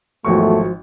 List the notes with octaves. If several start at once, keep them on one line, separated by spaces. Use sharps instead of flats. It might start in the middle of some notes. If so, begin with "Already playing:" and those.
G#1 E2 F3 F#3 A3 C#6